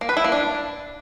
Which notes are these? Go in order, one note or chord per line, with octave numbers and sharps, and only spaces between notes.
A#3
B4
E4
A#3
D4